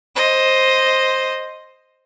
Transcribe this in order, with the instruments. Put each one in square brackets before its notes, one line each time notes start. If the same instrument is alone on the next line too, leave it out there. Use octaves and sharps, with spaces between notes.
[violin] C5 D#5